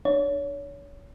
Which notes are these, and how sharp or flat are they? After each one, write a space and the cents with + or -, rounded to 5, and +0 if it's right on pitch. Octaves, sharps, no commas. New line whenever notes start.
D4 +30 C#5 +30